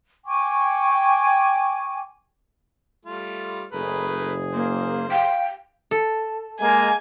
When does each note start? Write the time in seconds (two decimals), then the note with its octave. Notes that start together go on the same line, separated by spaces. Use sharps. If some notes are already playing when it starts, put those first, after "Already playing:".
0.25 G5 G#5 C#6 D6
3.05 G3 A3 F4
3.72 F#1 A3 G#4 A#4 B4
4.54 A#3 C5
5.11 F5 G5
5.91 A4
6.60 G#3 A#3 G#5